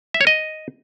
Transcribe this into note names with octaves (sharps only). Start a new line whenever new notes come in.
E5
C#5
D#5